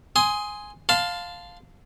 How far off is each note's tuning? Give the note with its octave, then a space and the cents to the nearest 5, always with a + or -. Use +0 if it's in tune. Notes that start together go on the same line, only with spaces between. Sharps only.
G#5 +0 C6 +0 D#6 +20
F5 +10 A5 +0 C6 -25